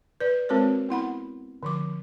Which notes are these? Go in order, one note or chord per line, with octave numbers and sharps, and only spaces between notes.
B4 D5
G#3 C4 F#4 A#4 C5 C#5
B3 E4 F#5 B5
D3 F3 D6